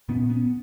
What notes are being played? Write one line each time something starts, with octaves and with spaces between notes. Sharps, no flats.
A#2 B3 C#4
B3 C#4